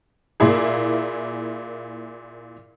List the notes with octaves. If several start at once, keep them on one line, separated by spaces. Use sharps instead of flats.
A#2 A#3 E4 G#4